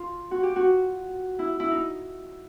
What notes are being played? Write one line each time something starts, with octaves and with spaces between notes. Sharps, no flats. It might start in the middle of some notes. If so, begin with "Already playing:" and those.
Already playing: F4
F#4
G4
F#4
E4
E4
D#4